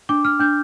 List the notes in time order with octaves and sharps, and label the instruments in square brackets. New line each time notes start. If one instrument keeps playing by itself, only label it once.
[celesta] D4 D6
F6
D4 G6